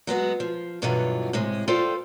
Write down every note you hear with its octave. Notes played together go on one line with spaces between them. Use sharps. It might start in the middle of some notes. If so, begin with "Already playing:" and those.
F#3 G#3 B3 F#4
F3
G2 B2 D3 E3 F#3 F4
A2 C3 G#3
F4 A4 C5 D5 F5 G5